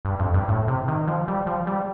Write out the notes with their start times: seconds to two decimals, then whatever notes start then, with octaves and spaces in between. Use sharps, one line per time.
0.05 G2
0.19 F2
0.34 G2
0.48 A2
0.68 C3
0.88 D#3
1.07 F3
1.28 G3
1.47 F3
1.67 G3